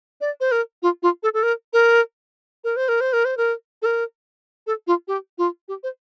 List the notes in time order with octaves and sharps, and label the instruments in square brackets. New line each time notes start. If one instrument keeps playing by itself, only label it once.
[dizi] D5
C5
A#4
F4
F4
A4
A4
A#4
A#4
A#4
C5
A#4
C5
A#4
C5
A#4
A4
A#4
A4
F4
G4
F4
G4
C5